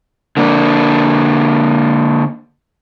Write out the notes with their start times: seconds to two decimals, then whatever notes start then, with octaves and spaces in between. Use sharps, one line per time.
0.37 D3 A#3 D4